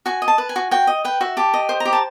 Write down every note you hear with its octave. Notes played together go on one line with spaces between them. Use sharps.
F#4 G#5
D#5
A5
B4
G#5
F#4
F#4 G5
D#5
B4 G5
F#4 E5
G4 A5
D#5
C5
A#5
G4
A5